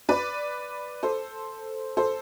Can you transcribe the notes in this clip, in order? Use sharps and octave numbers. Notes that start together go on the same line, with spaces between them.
B4 D5
A4 C5
A4 C5